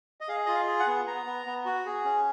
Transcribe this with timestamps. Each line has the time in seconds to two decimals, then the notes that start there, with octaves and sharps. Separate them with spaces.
0.21 D#5
0.28 G#4 F5
0.46 F4 D#5
0.54 F5
0.67 G#4
0.80 F#5
0.87 B3
1.07 B3 A#5
1.26 B3
1.46 B3
1.66 F#4
1.85 G#4
2.04 C#4